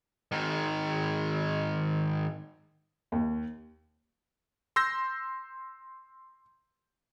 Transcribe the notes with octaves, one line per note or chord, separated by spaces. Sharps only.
G#2 D#3
D#2
C6 E6 G6 A#6